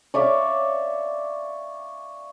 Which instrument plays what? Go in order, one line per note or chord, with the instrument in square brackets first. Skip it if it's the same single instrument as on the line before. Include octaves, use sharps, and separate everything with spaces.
[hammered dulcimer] C#5 D5 E5 F5